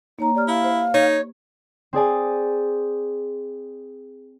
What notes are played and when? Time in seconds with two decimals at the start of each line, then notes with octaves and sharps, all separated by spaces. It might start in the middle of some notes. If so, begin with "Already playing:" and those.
0.19 A#3 D#4 C#5 A#5
0.35 G4 D5 F6
0.48 E4 F5
0.64 C5
0.94 D#4 C#5
1.93 C4 G#4 D5 G#5